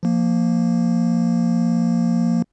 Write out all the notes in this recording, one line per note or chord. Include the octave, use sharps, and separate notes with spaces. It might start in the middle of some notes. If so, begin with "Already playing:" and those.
F3 A#3